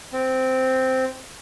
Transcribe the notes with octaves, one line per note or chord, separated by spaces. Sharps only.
C4